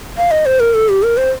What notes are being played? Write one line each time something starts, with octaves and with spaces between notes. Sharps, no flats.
F5
D#5
C5
A#4
A4
G4
A#4
C5